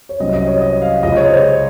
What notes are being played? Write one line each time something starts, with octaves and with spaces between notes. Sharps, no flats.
C#5
C2 C3 F#3 C#4 D#5
D#5
C#5
D#5
F5
C#2 C#3 G#3 D#5
C#5
C5